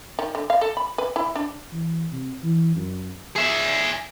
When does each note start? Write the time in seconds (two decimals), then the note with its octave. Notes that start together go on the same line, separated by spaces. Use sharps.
0.19 D#3
0.35 D3
0.50 F5
0.61 A4
0.77 B5
0.98 B4
1.16 E4
1.36 D4
1.72 E3
2.12 C3
2.43 E3
2.75 F#2
3.36 G#4 E5